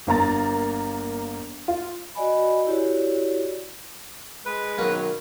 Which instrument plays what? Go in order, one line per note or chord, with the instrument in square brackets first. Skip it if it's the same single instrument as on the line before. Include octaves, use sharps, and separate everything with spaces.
[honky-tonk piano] G1 A#3 A#5 A6
F4
[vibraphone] F#4 D5 D#5 G#5 B5
E4 F#4 G4 C#5 D5
[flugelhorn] G#3 [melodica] B4
[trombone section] B2 D#3 F#3 [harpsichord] A#3 C#4